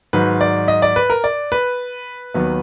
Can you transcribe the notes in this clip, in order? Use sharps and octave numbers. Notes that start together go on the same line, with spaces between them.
G#2 D#3 F#3 B4
D5
D#5
D5
B4
A#4
D5
B4
D#2 D#3 F#3 B3